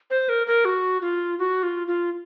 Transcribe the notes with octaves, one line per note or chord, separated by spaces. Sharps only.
C5
A#4
A#4
F#4
F4
F#4
F4
F4